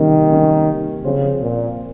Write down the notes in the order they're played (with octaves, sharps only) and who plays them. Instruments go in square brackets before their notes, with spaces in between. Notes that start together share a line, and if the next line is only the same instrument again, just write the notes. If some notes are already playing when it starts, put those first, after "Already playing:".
Already playing: [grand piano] C3 G3 A#3 C#4 [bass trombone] D#3
[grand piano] C3 G3 A#3 C#4
[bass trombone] C#3 [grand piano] F3 C4 F4 C5
[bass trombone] A#2